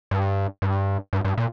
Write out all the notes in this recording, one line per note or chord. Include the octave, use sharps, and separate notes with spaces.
G2
G2
G2
G2
A#2